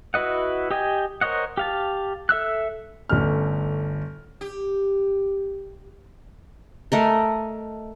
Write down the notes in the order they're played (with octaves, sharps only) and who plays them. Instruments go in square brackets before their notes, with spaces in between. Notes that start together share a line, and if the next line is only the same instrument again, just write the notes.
[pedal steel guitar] E4 F#4 B4 D#5 F#5
G4 D#5 G5 G#5
A#4 C5 C#5 D#5 F#5
G4 F5 A5
A4 E5 E6 F#6
[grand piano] G1 A3 C#4 F6
[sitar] G4
[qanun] A3 A#4 D#5